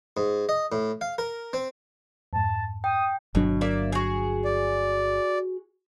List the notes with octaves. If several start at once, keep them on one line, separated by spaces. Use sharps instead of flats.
G#2
D#5
A2
F5
A#4
C4
F2 G#2 A5
G5 D#6
G1 B2 F#3 D4
A#3 D5 E5
F#4 G#4
D5